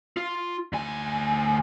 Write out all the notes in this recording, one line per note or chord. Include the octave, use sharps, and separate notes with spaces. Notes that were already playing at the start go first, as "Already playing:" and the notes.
F4
D2 G#5